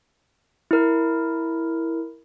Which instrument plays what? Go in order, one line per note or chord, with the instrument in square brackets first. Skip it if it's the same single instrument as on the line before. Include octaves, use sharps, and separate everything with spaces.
[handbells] E4 A#4